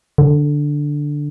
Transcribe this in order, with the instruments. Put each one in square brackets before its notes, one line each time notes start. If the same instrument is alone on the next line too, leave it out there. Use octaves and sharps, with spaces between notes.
[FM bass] D3